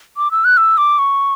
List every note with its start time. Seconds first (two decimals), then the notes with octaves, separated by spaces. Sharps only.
0.17 D6
0.31 E6
0.44 F#6
0.57 E6
0.78 D6
0.99 C#6